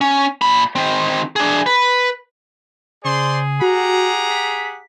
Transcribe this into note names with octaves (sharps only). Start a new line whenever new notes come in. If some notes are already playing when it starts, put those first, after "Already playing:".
C#4
A#2 B5
D#3 C4
D4 G#4
B4
C#3 G#4 C5 D5 C6
F#4 G4 F#5 A#5
B6